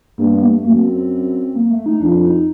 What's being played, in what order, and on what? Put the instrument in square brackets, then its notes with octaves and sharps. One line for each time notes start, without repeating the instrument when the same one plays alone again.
[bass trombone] G2 [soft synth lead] A#3
[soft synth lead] B3
A#3
A3
[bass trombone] F#2 [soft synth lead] A#3
[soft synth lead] C4
C4
A#3
A3
D#4
[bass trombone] F2 [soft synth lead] D4
[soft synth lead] D#4